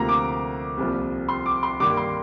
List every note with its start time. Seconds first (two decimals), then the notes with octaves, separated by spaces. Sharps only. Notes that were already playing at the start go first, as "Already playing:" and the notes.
Already playing: D2 C3 F3 A#3 A#5
0.09 D6
0.77 C2 A#2 F3
1.29 C6
1.46 D6
1.63 C6
1.80 G2 D#3 A#3 D6
1.97 C6